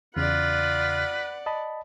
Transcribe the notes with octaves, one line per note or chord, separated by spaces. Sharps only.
E2 C#3 F4 B4 D5 F#5
D#5 A5 B5